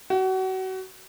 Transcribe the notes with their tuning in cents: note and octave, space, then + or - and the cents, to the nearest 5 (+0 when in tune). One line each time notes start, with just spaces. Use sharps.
F#4 +30